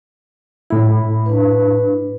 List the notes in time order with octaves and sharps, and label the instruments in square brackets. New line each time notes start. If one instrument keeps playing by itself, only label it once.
[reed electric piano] A2 E4 [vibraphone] B5
[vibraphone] D4 B4